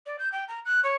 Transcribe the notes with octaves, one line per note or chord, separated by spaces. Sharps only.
D5
G6
G5
A#5
F#6
C#5